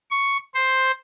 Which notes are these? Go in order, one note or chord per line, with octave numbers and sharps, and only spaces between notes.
C#6
C5